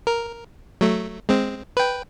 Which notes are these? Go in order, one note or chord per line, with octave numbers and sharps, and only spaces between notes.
A#4
F#3 A3
G#3 C4
B4 G5